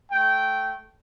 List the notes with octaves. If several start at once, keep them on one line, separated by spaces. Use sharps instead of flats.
A3 G5